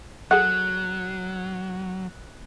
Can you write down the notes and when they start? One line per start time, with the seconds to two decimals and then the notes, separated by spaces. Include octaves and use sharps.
0.31 F#3 G#4 A4 F#5 F#6